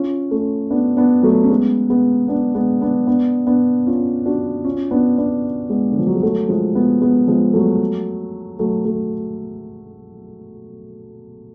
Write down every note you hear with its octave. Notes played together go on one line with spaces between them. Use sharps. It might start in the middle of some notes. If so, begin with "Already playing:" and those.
Already playing: C#4 F4
A3 C#4
B3 D4
B3 D4
F#3 A3
C#4
G#3 B3
G#3 B3
B3 D4
G#3 B3
B3 D4
B3 D4
B3 D4
C#4 F4
D4 F#4
C#4 F4
B3 D4
B3 D4
G#3 B3
D3
F3
F#3
G#3
F#3 A3
F3 G#3
G#3 B3
G#3 B3
F3 G#3
F#3 A3
F#3 A3
F#3 A3